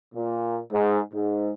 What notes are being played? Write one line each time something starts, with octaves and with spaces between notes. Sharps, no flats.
A#2
G#2
G#2